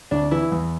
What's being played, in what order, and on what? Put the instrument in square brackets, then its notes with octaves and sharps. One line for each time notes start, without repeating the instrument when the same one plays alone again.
[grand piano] D2 [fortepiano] D4
[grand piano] E3 [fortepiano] E4
[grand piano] E2